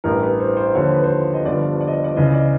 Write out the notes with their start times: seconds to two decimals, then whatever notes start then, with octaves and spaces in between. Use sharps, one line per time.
0.04 A1 G2 E3 A#4
0.22 B4
0.40 C5
0.57 C5
0.75 D#2 D3 F3 C#5
0.84 C5
0.94 B4
1.04 C5
1.34 D#5
1.45 G1 G2 D3 F3 D5
1.81 D5
1.87 D#5
1.93 D5
2.04 D5
2.16 C#2 C#3 E3 D#5
2.27 D#5
2.34 D5